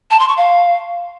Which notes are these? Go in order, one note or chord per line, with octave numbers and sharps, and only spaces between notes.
A5
C6
C#6
F5